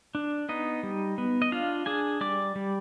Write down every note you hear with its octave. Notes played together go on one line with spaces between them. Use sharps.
D4
B3 D#4 D#5
G3
B3
D#5
D4 F4 F5
D4 G#4 G#5
G3 D5 D6
G3